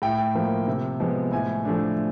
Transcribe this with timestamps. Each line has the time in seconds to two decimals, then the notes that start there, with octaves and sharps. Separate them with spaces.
0.02 A2 G5
0.35 F3 A#3
0.68 C3
1.00 F3 G#3 B3
1.32 A2 G#5
1.65 F3 A3 D4